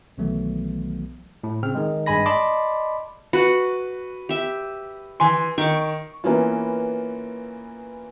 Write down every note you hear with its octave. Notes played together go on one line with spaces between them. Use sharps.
B1 D#3 E3 F#3 A3 B3
A2
C#3 C4 F6
D#3 G#3
G#1 G2 G#3 G#5 B5 A#6
D5 D#5 A5 B5 C6 D6
F#4 B4
G4 E5
E3 G#5 C6
D#3 C#6 D6
E3 A#3 B3 C#4 E4 F4